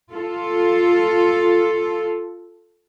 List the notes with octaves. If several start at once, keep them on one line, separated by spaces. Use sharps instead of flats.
F4 A4